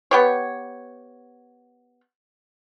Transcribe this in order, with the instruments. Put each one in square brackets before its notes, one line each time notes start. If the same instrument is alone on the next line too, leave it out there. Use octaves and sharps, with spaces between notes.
[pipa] B3 G4 C#5